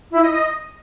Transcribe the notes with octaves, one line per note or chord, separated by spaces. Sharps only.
E4
D#5
D#5